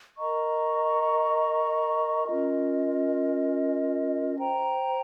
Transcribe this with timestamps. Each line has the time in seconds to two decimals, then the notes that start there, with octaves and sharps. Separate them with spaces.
0.16 A#4 D#5 A#5 C#6
2.27 C#4 F4 A#4 D#5
4.38 C5 G5 A#5